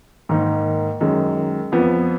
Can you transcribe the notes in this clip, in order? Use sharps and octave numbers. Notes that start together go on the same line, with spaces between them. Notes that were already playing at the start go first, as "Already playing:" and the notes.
G#2 D#3 A#3 D#4
F#2 D#3 G#3
F2 F3 B3